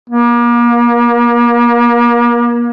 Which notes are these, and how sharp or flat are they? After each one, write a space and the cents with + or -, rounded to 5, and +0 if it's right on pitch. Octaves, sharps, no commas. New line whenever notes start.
A#3 +35